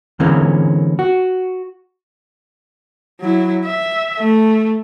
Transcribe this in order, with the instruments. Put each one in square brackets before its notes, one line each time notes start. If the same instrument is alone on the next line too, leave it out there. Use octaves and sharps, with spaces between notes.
[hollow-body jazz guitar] D3 E3 G#3 A#3 C4 C#4
F#4
[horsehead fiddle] F#3 E4
E5
A3